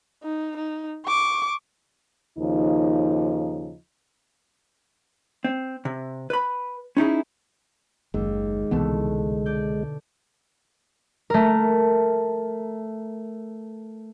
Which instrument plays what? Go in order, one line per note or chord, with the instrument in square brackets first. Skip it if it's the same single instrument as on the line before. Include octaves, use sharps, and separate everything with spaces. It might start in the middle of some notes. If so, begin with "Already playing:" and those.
[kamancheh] D#4
D#4
C#6 D6
[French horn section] D#2 C#3 F3 D#4
[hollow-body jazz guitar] C4
C3
B4 B5
C#4 D#4 E4 G#4
[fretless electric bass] F#1 [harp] D#2 [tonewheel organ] G#3
[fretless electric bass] C2 E3 B3 [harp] B2 D3 A3
[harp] D5 G6
A3 A#4